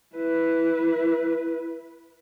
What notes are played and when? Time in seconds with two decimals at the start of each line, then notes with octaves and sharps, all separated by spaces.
0.14 E4 B4